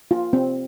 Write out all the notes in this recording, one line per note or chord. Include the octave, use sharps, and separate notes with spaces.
F4
C4